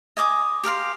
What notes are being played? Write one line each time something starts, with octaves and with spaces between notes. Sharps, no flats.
D#5 G#5 D6 D#6
G4 A#4 F5 C6